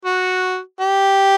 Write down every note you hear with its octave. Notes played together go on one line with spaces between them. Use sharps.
F#4
G4